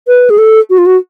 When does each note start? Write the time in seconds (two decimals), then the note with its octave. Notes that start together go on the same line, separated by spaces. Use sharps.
0.08 B4
0.30 G#4
0.38 A4
0.70 F#4
0.78 F4
0.86 F#4